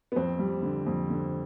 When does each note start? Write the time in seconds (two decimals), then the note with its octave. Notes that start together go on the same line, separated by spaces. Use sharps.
0.12 B3
0.16 F2 C4
0.39 G3
0.62 D3
0.87 F2
1.10 D3